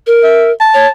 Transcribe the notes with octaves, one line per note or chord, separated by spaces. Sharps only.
A#4
E5
A5
C#5